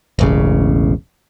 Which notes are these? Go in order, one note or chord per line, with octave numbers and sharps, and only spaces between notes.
E1 A1 C#3